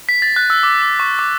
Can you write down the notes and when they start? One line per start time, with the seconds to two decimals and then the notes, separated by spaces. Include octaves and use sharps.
0.09 B6
0.22 A6
0.36 F#6
0.50 E6
0.63 D6
0.82 D6
1.00 C#6
1.19 D6